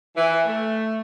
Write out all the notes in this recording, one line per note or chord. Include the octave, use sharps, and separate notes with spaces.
E3
A3